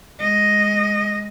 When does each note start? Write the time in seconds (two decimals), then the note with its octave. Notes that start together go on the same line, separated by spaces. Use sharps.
0.20 G#3 D#5